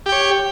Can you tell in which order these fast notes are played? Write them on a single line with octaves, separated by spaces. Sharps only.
G4 G5 C#5